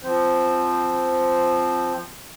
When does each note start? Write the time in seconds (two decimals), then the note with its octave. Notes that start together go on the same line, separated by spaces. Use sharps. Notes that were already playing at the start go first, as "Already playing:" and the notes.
0.03 F3 C4 C5